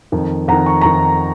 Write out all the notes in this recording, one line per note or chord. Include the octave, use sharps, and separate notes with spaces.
F2 D#3
F2 D#3 F#5 A#5
C#6
F2 D#3 A#5 C#6